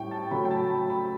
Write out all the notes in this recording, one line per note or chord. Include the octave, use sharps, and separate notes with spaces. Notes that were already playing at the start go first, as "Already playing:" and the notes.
Already playing: A2 G3 C#4 E4 G5 C#6
A5
C#3 F#3 A3 C#4 B5
G5
A5
B5
B5